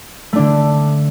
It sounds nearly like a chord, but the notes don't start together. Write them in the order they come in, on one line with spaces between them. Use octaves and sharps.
A3 D4 D3